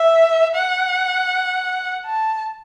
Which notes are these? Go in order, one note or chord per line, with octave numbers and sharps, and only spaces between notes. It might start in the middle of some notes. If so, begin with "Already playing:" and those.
Already playing: E5
F#5
A5